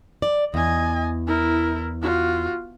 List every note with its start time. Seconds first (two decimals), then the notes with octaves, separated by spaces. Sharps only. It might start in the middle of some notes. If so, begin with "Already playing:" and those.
0.22 D5
0.54 E2 D#5 G#5
1.27 E4 A#4
2.02 F4 F#4